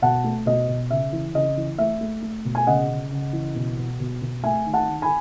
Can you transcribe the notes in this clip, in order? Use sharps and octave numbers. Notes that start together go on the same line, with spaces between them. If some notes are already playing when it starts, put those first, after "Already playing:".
B2 F#5 A5
A3
B2 D#5
B2
C#3 E5
E3
C#3 D#5
E3
A3 E5
A3
A3
B2
G#5
C#3 D#5 F#5
C#3
C#3
E3
B2
B2
B2
B2
A3 E5 G#5
D#3
F#5 A5
D#3
G#5 B5